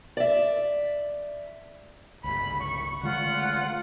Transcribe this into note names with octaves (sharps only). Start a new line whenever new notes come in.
D5 E5
G1 C#2 B5
C#6
D3 G#3 A3 F4 F#5